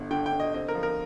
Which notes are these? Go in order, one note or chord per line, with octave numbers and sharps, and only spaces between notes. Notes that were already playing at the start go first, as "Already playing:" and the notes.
Already playing: G1 D3
D3 G5
G5
D3
D#5
C4 D#5
A#4
F3
A#4